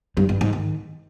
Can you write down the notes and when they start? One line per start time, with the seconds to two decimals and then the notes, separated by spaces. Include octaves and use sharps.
0.17 G2
0.29 G2
0.41 G#2
0.53 D#3